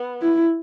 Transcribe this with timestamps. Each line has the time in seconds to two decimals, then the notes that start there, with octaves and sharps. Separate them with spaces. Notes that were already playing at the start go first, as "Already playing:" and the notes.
Already playing: B3
0.22 E4